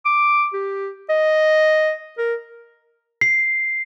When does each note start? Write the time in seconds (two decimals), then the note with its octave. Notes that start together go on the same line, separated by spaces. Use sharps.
0.05 D6
0.53 G4
1.09 D#5
2.18 A#4
3.21 C7